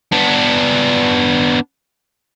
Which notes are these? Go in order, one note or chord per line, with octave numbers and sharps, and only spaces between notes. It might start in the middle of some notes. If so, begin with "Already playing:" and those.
B3 D4